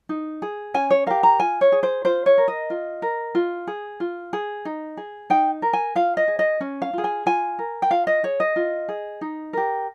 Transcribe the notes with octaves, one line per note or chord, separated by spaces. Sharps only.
D#4
G#4
C#4 G#5
C#5
G4 A#4 F5
A#5
F4 G#5
C#5
G#4
C5
F4 C5
C#5
A#4
D#5
F4
A#4
F4
G#4
F4
G#4
D#4
G#4
D#4 G5
A#4
G#5
F4 F5
D#5
G#4
D#5
C#4
F5
F4 G#4
G#5
F4 G#5
A#4
G5
F4 F5
D#5
G#4 C#5
D#5
F4
G#4
D#4
G4 A#4